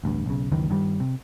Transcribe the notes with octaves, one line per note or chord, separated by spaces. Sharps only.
A1 D2 G2
B1 C#3
C#2 F#2 D#3 E3
G2 D#3 F#3 G3
C3